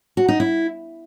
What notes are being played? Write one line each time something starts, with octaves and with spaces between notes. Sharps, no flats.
F#4
D#4
E4